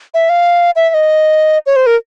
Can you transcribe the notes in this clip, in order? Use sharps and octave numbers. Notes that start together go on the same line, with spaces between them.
E5
F5
E5
E5
D#5
C#5
C5
A#4